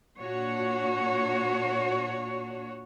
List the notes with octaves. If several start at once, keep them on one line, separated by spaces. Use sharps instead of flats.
A#2 D4 F#4 C#5